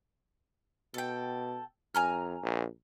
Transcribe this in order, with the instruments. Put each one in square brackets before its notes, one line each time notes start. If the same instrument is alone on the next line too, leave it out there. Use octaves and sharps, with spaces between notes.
[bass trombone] B2 [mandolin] A4 G5
[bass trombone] F2 [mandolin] G#5 A#5 F6
[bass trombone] A#1